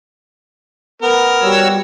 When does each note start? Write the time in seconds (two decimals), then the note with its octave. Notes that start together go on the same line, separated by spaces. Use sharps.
1.02 B3 A#4
1.42 G3 F#4 C#5 E6